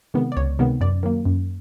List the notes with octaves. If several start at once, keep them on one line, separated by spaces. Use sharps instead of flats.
C3 D#3 G#3 B3
D5
C#2 C#5
C3 D#3 G#3 B3
F#2 D5
D#3 F#3 A#3
F#2